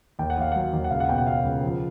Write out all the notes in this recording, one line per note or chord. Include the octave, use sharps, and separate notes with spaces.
D#2 G5
F#5
D#2 F5
F#3 F#5
D#2
F#5
C#2 F5
F#5
B2 G5
F#5
B2 F5
C#2
F3